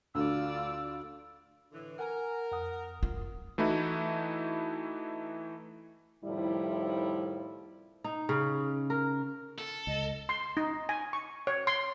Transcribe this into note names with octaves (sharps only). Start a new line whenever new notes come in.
D2 F4 D5 E6
A2 D3 E3
A#4 F#5 G#5 A#5
F2 F#5 D#6
F4
E3 A3 D#4 E4 F#4
F2 A2 D#3 F3 G3 E4
D#4
C#3
A#4
A4
C#2 D#5
C6
D#4
G#5
C#6
C#5
C6